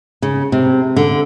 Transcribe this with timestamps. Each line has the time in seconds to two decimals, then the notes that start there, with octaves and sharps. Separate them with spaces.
0.22 C#3
0.52 C3
0.97 D3